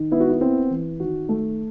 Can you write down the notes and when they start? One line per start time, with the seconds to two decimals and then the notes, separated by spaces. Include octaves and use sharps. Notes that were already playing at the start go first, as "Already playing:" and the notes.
Already playing: D#3
0.12 B3 E4
0.20 F#4
0.29 E4
0.41 C4 E4
0.70 E3
1.00 D#3 F#4
1.29 A3